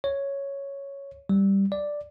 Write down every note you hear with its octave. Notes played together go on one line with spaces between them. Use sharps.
C#5
G3
D5